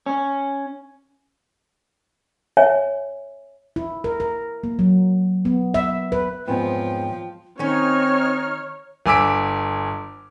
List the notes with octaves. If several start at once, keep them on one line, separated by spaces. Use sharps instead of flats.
C#4
C#5 E5 G#5
E4
A#4
A#4
A#3
F#3
B3
E5
B4
E2 G#2 F3 B3 C4 C#5 G5
D#3 C4 C#4 D#4 C#5 F6
G1 G#5 D6 E6 B6 D7